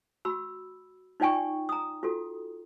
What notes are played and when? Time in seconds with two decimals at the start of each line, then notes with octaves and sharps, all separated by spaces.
0.25 F#4 B5 E6
1.20 D#4 F4 D5 G5 G#5 C#6
1.69 A#5 D#6
2.03 F4 F#4 A4